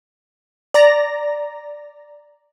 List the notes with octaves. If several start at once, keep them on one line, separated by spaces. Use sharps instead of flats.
D5 A#5 A#6